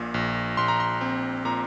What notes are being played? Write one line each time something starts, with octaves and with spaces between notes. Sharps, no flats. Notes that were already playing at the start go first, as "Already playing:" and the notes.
Already playing: A#1 A#2
A#1
A#1 C6
A#5
C6
C4
A#2 A#5